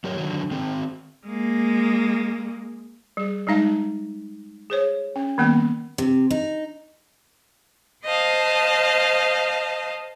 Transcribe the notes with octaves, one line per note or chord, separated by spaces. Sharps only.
F#3 G4 A#4 C#5
D3 D#3 F#3
D#3 C4
G#3 A#3
G3 G#4
G3 G#3 D#4 F5 A5
G#4 C5 C#5
C#4
D#3 G3 A#3 B3 G5
C3
D#4
C5 D#5 F5 A5